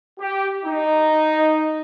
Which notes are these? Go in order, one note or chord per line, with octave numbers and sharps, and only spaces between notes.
G4
D#4